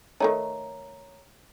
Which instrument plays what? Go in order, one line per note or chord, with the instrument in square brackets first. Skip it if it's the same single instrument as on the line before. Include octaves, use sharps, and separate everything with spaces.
[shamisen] D#3 A3 D#4 [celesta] C#5 A#5